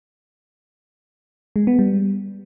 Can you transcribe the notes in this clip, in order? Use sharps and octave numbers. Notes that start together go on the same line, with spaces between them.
G#3
B3
G3